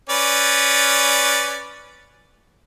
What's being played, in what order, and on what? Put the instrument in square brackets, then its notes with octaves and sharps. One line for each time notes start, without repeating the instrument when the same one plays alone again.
[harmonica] C#4 B4 D5